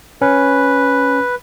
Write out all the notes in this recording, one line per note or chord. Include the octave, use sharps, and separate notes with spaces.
C#4 B4